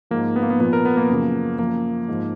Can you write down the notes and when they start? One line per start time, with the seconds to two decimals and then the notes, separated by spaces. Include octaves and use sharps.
0.11 G#2 F3 A#3
0.36 B3
0.43 A#3
0.50 B3
0.60 A#2 F3 B3
0.73 A#4
0.85 B3
0.97 A#3
1.10 F#2 C#3 F3
1.58 F#2 F3 A#3
2.08 G#2 F3